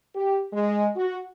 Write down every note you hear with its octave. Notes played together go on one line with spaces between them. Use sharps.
G4
G#3
F#4